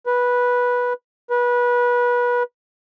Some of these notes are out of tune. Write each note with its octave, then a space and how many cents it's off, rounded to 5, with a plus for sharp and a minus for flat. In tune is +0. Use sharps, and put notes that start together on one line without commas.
B4 -10
B4 -25